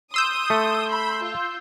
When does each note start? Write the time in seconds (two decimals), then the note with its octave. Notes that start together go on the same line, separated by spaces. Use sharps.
0.14 C6 D#6 E6 G6
0.50 A3
0.90 B5
1.23 F4